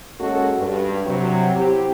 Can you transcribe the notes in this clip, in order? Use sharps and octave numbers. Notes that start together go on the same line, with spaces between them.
G#3 A#3 C#4 F#4 A4
G2
C3 F#3
C4 E4 G4